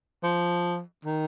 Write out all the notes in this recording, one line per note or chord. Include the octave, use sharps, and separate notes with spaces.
F3
D#3